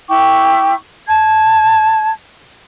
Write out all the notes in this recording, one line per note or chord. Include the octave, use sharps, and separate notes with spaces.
E4 G5 C#6 D6
A5 G#6